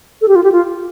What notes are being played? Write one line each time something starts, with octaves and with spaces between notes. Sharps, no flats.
A4
G4
F4
G4
F4